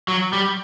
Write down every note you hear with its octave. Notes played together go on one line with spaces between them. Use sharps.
F#3
G3